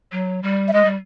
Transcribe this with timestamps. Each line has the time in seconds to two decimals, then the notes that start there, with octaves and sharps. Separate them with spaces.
0.12 F#3
0.43 G3
0.68 E5
0.73 G#3 D#5
0.85 G3